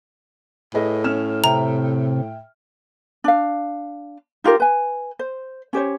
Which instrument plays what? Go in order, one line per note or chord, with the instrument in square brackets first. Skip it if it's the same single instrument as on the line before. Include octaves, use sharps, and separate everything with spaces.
[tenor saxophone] A2 [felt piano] G#4 B4 D#5
[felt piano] C#4 F6 E7
[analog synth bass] C3 [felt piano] E5 G5 [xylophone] A#5
[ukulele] D4 F5
D#4 F4 G4 A#4
B4 G#5
C5
C#4 G4 C5 C#5